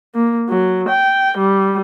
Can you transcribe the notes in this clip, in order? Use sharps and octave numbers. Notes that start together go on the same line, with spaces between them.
A#3
F#3
G5
G3